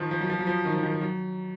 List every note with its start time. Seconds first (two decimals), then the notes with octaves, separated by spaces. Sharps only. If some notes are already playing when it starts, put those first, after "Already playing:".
Already playing: D#3 F3
0.11 F3
0.21 F#3
0.30 F3
0.39 F#3
0.47 F3
0.65 D#3
0.74 F3
0.83 D#3
0.92 F3
1.01 F#3